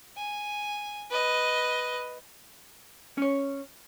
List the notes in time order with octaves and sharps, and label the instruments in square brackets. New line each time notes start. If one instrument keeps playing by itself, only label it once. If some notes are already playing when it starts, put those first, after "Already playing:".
[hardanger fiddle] G#5
B4 D#5
[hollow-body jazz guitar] C#4 C#5